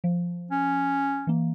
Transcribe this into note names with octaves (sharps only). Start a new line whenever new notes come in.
F3
C#4
E3 A#3